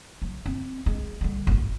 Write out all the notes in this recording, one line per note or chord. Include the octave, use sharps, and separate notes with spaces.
F#3
C4
G#3
D3 G3
D1 G#1